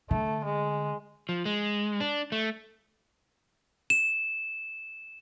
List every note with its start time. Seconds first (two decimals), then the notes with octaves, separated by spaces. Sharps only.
0.11 D3 A3
0.44 G#3
1.29 F3
1.45 G#3
2.00 D4
2.32 A3
3.90 E7